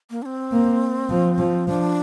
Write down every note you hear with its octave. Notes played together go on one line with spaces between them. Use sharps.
A#3
D4
C4
A#3
F3
F3
F3 D4